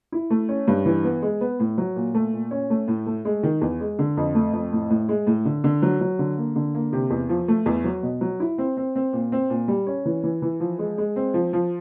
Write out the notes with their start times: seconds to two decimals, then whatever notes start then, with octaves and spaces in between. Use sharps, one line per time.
0.12 E4
0.30 A3
0.49 C#4
0.68 G2
0.85 E3
1.04 B3
1.22 G#3
1.41 B3
1.60 A2
1.78 F#3
1.96 A#2
2.14 A3
2.33 A#2
2.51 C#4
2.70 A3
2.88 A2
3.06 A3
3.25 G#3
3.43 D#3
3.61 E2
3.81 G#3
3.99 D3
4.17 F2
4.35 A3
4.53 F2
4.72 A2
4.90 A2
5.09 G#3
5.27 A2
5.45 D3
5.64 D3
5.82 F#3
6.01 F#3
6.19 D3
6.37 A#3
6.56 D3
6.74 A#3
6.93 C3
7.10 E2
7.29 F3
7.48 A3
7.66 E2
7.84 F#3
8.03 B2
8.21 F#3
8.40 E4
8.58 C4
8.77 C4
8.96 C4
9.13 A#2
9.32 C4
9.50 A#2
9.68 G3
9.87 C#4
10.05 E3
10.24 E3
10.42 E3
10.60 F3
10.79 G#3
10.98 G#3
11.16 C4
11.34 F3
11.53 F3